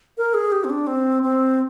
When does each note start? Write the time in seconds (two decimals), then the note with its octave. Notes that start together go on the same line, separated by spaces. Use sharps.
0.17 A#4
0.34 G#4
0.52 G4
0.64 C4
0.70 D4
0.87 C4
1.23 C4